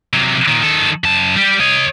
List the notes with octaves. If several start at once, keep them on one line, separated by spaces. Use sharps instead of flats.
C3 F#3
A#2 D#3
D#3 A4
F#2 A5
G3 G4
C#5 D#5